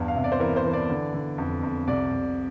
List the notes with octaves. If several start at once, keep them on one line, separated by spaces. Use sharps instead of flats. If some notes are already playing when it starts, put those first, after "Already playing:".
Already playing: E2 G2
F5
C3 E5
D5
C5
E3 A#4
C5
E3
D5
D3
D3
F2
F2
C2 D5
C2